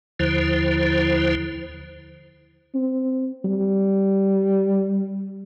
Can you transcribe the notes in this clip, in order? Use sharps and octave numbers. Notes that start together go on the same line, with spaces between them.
D#2 D3 F3 E4 C5
C4
G3